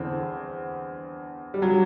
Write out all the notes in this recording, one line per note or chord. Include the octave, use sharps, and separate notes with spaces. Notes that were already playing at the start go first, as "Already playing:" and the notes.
Already playing: E2 D3 C4
G3
F#3